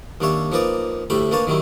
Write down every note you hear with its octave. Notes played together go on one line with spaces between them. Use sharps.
D#2 G3 D4 C#5 E5
F3 A#3 D#4 B4 D5
D2 A2 G3 A3 G4 B5
A#3 D4 B4 C#5 A5
D#3 F#3 G3 E4